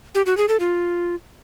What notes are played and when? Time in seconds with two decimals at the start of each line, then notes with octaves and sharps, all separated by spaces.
0.15 G4
0.26 F#4
0.37 G#4
0.49 A4
0.60 F4